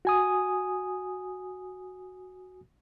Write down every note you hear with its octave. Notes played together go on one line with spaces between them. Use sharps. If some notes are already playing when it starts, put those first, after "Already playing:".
F#4 G#5 D#6